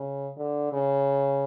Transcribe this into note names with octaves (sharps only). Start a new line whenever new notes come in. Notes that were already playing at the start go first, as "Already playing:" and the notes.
Already playing: C#3
D3
C#3